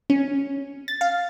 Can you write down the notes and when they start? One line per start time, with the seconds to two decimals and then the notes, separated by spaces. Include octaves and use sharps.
0.10 C#4
0.88 A6
1.01 F5